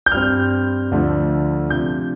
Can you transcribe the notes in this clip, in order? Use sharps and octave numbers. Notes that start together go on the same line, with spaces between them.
G6
G2 G3 C4 F6
D2 D3 F3 A3 D4
C3 F3 D4 G6